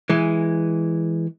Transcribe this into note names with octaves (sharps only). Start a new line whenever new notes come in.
E3 G#3